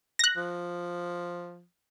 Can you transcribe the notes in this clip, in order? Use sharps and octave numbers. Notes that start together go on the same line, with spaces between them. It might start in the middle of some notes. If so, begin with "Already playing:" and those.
F#6 A#6
F3